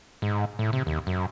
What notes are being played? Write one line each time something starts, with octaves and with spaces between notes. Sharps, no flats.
G#2
A2
C3
D#2
F#2